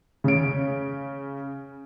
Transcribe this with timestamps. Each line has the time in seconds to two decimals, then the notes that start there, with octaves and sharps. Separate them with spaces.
0.24 C#3 D7